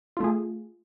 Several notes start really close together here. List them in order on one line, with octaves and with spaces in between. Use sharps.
F4 A3 G#4